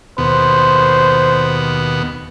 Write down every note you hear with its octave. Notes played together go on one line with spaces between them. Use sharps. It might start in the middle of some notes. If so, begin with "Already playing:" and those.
D#2 B2 B3 C5